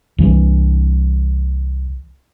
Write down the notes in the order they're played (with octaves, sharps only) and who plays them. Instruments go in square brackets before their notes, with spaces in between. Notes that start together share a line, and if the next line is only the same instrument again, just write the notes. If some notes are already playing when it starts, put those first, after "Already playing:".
[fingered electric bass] C2 E3